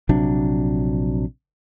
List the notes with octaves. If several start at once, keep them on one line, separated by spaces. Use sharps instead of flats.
A#1 C3 F#3 D4